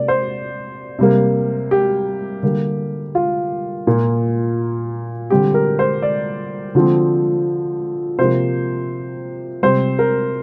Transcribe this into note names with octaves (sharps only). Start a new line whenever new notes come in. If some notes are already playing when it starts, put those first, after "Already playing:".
Already playing: C3 A#3 D5
C5
C3 G3 A#3
G4
D3 G3 A#3
F4
A#2 A#3
D3 G3 C4 G4
A#4
C5
D5
D3 F3 C4
C3 F3 A#3 C5
C3 G3 C4 C5
A#4